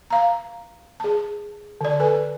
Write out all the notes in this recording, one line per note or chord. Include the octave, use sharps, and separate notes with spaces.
F5 A#5
G#4 A5
D3 D5
A4 B4 G#5